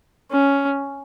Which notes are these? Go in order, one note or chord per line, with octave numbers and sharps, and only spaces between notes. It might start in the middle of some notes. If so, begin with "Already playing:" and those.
C#4